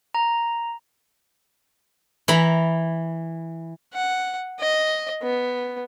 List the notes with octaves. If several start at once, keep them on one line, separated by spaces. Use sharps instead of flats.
A#5
E3 A#5 B5
F#5
D#5
B3